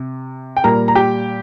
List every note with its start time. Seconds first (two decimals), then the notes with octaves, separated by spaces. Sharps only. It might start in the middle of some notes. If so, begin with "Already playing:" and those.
Already playing: C3
0.57 G5
0.64 A#2 G3 A#4 A#5
0.88 A#5
0.95 G4 G5